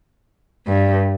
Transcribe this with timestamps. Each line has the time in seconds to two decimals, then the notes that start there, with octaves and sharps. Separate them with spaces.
0.67 G2